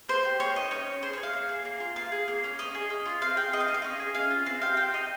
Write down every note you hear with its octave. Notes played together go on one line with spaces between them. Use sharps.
A#3 C5
G4
A#3 C#5
D#4 D#5
C#4 C#5
C#4
G#4 C5
C#5
G#4
F5
A#3
G#4
A#3
F4
A#3 F5
G#4
A#3
C#4
C#4 D#5
G#4
C#4
F4
C4 F5
G#4 G5
C4 D#5
F5
D#4 D#5
F5
C#4 D#5
G#4
C#4 F5
F4
C4 F5
G4 F5
C4 G5
D#4 D#5